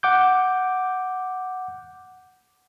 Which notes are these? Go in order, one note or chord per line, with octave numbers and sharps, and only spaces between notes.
F#5 D6 G6